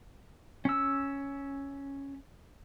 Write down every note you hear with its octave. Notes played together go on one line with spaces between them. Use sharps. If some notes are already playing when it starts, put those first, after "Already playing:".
C#4 E6